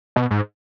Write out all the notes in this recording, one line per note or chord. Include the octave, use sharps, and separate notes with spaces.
B2
G#2